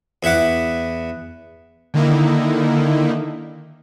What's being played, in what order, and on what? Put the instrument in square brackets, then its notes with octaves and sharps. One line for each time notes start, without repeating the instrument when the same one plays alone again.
[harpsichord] E2 E4 E5 F#5 D6
[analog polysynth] D3 D#3 A#3 D#4 E4